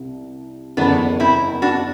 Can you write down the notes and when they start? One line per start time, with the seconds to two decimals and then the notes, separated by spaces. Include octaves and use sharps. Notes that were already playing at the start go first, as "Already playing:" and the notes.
Already playing: C2
0.77 F#1 E2 D3 B3 D4
1.20 C4 E4
1.62 D4 F#4